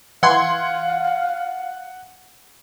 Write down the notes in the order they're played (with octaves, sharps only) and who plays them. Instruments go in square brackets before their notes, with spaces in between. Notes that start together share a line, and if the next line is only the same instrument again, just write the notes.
[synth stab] E3 C6 G#6 [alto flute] F5 [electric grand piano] F#5